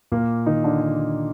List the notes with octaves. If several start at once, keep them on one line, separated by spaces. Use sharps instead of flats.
A#2 A#3
D#3 D#4
D3 D4
D3 D4